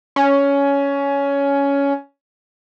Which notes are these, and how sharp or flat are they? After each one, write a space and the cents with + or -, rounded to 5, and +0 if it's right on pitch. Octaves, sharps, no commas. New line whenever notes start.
C#4 +15